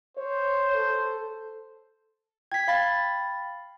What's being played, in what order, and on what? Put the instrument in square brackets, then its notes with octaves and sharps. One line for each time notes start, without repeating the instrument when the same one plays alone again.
[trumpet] C5 [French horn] C#5
[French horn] A4
[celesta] G5 [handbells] G#6 B6
[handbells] F5 B5 A6